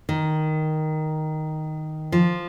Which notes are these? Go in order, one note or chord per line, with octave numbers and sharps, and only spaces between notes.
D#3
F3